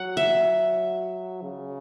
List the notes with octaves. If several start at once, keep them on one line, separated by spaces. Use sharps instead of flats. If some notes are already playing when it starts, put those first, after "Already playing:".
Already playing: F#3 F#5
E5
C#3